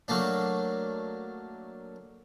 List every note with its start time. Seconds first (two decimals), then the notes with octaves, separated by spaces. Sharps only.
0.08 F#3 A3 A#3 D4